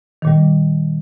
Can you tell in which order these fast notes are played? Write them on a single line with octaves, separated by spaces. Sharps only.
D#3 A#2 G3